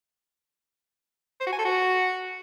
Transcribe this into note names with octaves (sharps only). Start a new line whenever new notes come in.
C5
F#4
G#5
A4
F#4